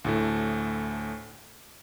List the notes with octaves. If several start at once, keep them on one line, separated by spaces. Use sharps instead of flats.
D2 A2 A3